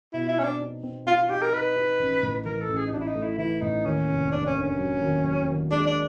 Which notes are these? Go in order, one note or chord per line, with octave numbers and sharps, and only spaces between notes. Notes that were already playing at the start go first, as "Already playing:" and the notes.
B2 E4
E4
C4 C#4
D4
D#4
C4
C4 F4
F4
D#4 G4
A#4
D#4 B4
D#4
A1
A2
E3 A#4
A4
A1
G#4
D#4
A1 D4
E4
D#4
A3
E4
E3 E4
A2 D#4
D#2 C#4
F1
F1 D4
C#4
D3
C#4
F#3
D#2
F#3
D#2
G#3 D4
D4